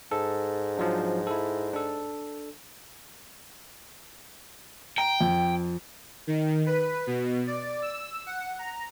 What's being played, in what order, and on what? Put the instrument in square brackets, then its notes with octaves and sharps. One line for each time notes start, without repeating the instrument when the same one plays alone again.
[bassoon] G#2 [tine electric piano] A4
[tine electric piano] F3 F#3 D4
E4 A4
D4 A4
[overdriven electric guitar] G5 [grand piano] A#5
[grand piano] F2
[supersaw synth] D#3
B4
B2
D5
E6
F#5
A#5